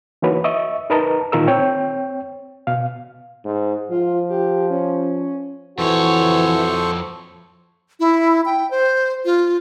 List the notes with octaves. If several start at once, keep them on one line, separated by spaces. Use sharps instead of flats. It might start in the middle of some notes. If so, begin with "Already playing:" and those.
E3 A#3 D#4 F#4 B4 C#5
D#5 E5 C#6
D#4 A#4 B4 D#5 A5 A#5
A#2 D#3 F4 A#4 E6
C4 C#5 G5
B2 F5
G#2
F3 F4
G4
C#4
F2 E3 F#4 A4 C5 C#5 C#6
E4
G5
C5
F4